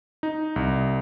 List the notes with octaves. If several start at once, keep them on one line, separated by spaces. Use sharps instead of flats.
D#4
C2